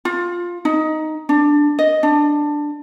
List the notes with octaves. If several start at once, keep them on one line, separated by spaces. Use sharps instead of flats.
F4
D#4
D4
D#5
D4